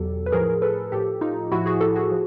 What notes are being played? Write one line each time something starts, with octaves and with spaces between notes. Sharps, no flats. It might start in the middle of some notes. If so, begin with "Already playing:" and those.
Already playing: E2 B2 F#3 G4 A4
B4
A2 F3 G#4 A#4
A4 B4
A2 F3 G4 A4
D#4 F4
A2 F3 E4 F#4
F#4 G#4
G4 A4
F#4 G#4
F3